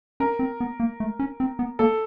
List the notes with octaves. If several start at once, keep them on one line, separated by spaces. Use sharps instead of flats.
C#4 A#4
C4
B3
A#3
A3
C#4
C4
B3
A#3 A4